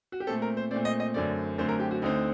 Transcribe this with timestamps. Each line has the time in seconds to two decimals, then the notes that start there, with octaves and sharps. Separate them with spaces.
0.12 F#4
0.20 G4
0.27 A#2 A3 C4 A4
0.42 A#4
0.57 C5
0.71 A#2 A3 C4 D5
0.85 D#5
1.00 D#5
1.14 F#2 D3 A3 C4 D5
1.58 F#2 D3 A3 C4 C5
1.69 A#4
1.80 G4
1.91 F#4
2.02 D2 D3 A3 C4 D#4